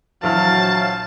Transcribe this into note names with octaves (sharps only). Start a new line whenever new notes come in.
A#1 E3 F#3 E4 C5 F5 A5 F6